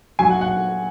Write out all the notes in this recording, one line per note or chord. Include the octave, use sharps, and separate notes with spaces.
F#3 G#5
F#5
F#5